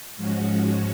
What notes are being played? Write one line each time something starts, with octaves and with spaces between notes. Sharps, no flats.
G#2 F3 G#3 C#4 F#4